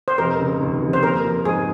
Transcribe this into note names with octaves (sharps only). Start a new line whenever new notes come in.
C5
F1 A#4
C#3
D#2
F1
C5
A#3 A#4
F3
G#2 G#4